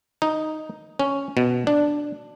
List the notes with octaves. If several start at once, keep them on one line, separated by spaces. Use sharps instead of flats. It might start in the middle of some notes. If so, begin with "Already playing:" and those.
D#4
C#4
B2
D4